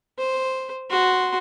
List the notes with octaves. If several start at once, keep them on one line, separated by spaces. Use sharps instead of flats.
C5
F#4 C6